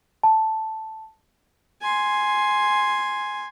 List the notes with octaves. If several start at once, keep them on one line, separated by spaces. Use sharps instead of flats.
A5
G#5 C6